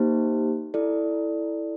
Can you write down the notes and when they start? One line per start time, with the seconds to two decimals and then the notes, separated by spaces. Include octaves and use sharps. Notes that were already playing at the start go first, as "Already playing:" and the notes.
Already playing: A#3 D#4 G4 C5
0.74 E4 A4 D5